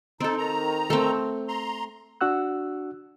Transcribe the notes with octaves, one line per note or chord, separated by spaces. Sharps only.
C4 D#4 A4
D#3 A#5
A3 C4
A#5 C6
D4 F#4 F#5 E6 F#6